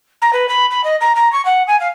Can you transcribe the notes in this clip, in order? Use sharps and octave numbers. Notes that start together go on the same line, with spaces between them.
A#5
B4
B5
B5
D#5
A#5
A#5
C#6
F#5
G#5
F5